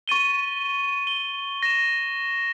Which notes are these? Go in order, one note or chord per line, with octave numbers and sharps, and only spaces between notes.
C#6 A6 D#7 G7
G7
A#6 E7